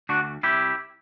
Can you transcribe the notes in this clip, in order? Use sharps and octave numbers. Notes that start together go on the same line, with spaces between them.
D2 D4 F#4
C3 G3 E4 G4